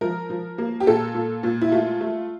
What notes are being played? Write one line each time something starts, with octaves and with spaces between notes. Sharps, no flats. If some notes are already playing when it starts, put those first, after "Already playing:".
F3 A#4
F3
A#3
G4
A#2 A4
A#2
A#2
E4
A3 F4
A3